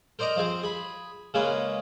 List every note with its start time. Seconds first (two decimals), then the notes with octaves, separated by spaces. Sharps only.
0.19 A#4 C5 D5 D#5 A#5
0.37 F3 C4 G#4 C5
0.63 G#4 B5
1.34 C#3 G#3 A#3 C#4 G#4 B4